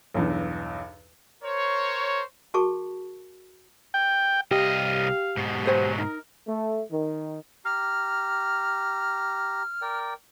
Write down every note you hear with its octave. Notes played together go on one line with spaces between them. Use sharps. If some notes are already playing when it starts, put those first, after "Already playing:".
B1 E2 G2
A#4 C5 C#5
F#4 G#4 A#4 A5 C#6
G5
C2 G4 D#5 F5
G#2 B2
F#3 B4 C5 G#5
D#4 A#4
A3
D#3
G4 A#5 F6
A#4 D5 G5